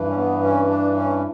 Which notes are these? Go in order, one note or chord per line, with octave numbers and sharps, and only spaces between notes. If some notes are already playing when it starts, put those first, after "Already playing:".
Already playing: G2 E3
C#4
B3
C#4
D4
C#4